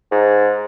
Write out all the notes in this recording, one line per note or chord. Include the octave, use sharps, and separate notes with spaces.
G#2